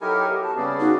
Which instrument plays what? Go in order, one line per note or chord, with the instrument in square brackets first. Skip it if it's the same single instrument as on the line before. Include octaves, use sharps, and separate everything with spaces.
[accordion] F#3 G4 A#4 [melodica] D#4 E4 G#5 [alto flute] A4
[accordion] B3 [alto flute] G4
[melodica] F#4 [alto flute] A5
[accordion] C#3 C#4 [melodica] G3 G#4 D5 [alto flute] B3
[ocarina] D#4 [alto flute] F#4